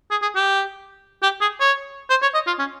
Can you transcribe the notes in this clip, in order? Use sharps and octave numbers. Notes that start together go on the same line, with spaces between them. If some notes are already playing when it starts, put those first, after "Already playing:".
G#4
G#4
G4
G4
G#4
C#5
C5
C#5
D#5
F4
C#4